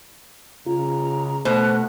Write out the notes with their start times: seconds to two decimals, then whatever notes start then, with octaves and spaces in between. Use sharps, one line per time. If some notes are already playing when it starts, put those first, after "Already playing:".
0.67 C#3 F4 A#5
1.45 B2 A3 C5 F#6